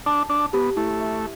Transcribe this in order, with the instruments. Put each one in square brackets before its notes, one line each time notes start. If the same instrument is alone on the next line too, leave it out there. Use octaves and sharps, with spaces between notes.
[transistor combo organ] D4 [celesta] A5
[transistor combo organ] D4 [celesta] A5
[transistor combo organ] B3 [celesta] G4
[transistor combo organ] A3 [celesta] E4
[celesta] E5